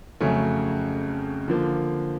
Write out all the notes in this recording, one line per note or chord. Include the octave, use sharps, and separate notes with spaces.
F2 C#3 F#3 A3 C#4
D3 F3 A#3